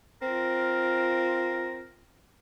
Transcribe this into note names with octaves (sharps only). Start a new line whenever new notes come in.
C4 F4 A#4